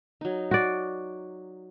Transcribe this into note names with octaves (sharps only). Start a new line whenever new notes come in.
F#3 D#4
F#4 D5